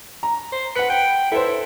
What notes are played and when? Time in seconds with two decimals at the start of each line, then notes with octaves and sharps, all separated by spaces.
0.23 A#5
0.52 C5
0.75 B4 F#5 C#7
0.90 G5
1.32 E4 A4 B4 C5